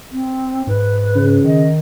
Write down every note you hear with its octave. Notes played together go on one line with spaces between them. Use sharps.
C4
G#2 B4
C#3
D#3 D#5